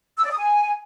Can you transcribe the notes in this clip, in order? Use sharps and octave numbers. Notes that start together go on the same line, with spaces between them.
E6
D5
D#6
G#5